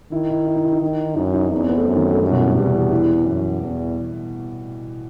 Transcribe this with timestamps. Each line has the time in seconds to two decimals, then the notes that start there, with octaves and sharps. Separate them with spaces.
0.12 D#3 E4
0.30 E4
0.47 E4
0.56 D#4
0.65 E4
0.72 D#4
0.81 D#3
1.16 F#2 D#4
1.34 D#4
1.52 E2 D#4
1.61 C4
1.69 B3
1.78 A3
1.86 F#2
1.95 D#3
2.13 A3
2.22 F#2 G3
2.30 B2
2.39 A2
2.48 G2
2.56 E2 C3
2.74 E3
2.91 E3
3.26 F#2
3.60 E2